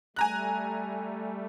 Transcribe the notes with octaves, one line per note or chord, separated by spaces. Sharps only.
G3 A3 G#5 A#5 F#6